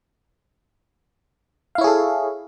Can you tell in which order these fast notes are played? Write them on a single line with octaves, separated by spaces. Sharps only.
F5 E4 C#5 G#4 A4